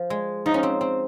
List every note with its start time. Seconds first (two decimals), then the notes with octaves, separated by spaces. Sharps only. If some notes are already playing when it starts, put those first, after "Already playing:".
Already playing: F3
0.10 G#3
0.46 F3 D#4
0.54 C#4
0.63 C4
0.81 C4